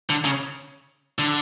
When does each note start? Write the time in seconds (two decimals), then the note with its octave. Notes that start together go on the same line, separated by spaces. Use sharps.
0.10 D3
0.25 C#3
1.19 D3